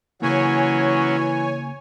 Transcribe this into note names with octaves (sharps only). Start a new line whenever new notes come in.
C#3 E3 F#3 A#3 C#4 C#5 G#5